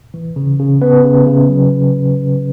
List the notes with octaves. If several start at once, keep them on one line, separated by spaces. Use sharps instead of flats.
E3
C#3
C#3
B3 B4
C#3
C#3
F#3